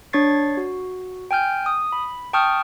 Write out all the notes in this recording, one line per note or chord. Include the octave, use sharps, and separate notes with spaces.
D4 C#5 C#6 A6 C7
F#4
G5 G#5 F6 G6
D#6
B5
G5 A5 C#6 D#6 F6 G6